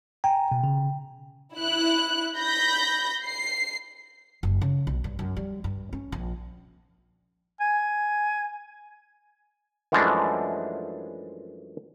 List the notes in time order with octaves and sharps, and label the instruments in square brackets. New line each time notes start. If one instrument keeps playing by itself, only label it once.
[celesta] G5 [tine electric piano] G#5 A#5
[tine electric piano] B2
C#3
[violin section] E4 F#6
B5 G6 A#6
C7
[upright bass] F#1
C#3
B1
G2
F#2
G3
G2
C#4
A#1
[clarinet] G#5
[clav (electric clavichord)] F#2 E3 F3 G#3 A3 D4